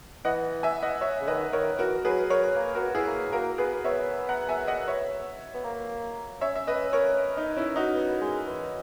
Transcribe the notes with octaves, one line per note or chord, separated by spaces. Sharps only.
E3 D#5 F#5
E5 G#5
D#5 F#5
C#5 E5
C#3
D#3 B4 D#5
D#3 A#4 C#5
E3 F#4 A#4
F#3 G#4 B4
F#3 A#4 C#5
A#3
F#4 A#4
B3
F#4
E4 G#4
A#3
A#3 F#4 A#4
B3 G#4 B4
B3 C#5 E5
F#5 A#5
E5 G#5
D#5 F#5
C#5 E5
B3
A#3
C#4 C#5 E5
E5
B4 D#5
A#4 C#5
D#4
C#4 E4
D#4 F#4
B3
G#3
E3